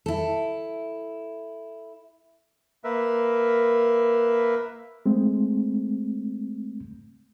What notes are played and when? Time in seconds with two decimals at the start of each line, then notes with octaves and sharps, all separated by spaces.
0.06 E4 A4
2.84 A#3 A#4 B4 E5
5.06 G#3 A3 C4